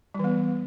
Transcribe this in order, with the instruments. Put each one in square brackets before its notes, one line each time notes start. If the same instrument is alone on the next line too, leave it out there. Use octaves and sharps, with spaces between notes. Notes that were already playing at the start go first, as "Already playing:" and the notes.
[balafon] G3
E3
B3